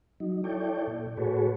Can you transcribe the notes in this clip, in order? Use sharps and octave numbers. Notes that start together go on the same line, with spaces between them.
F#3 D#4
E4 A4 C#5 D5 G5
A#2
A2 F#4 G#4 A4 B4 C#5